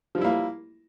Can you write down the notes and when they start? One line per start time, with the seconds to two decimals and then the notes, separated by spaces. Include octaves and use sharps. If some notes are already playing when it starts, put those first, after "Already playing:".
0.15 F3
0.18 G3
0.21 E4
0.25 A#3